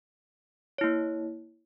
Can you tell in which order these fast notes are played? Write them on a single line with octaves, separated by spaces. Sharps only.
C#5 E4 A#3